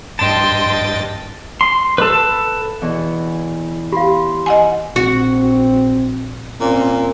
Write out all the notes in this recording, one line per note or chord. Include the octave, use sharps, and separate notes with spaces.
G2 D#5 G5 A5 C6 A6
C6
A4 B4
E2 B2 E3
G4 F5 B5 C6
D#5 F#5 G#5
A#1 C4 F#4
A#2 C4 C#4